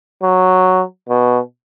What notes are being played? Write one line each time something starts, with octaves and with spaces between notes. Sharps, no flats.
F#3
B2